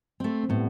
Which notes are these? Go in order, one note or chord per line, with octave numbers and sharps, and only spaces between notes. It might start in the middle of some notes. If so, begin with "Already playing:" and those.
A3 C4
C4
A2 G3 B3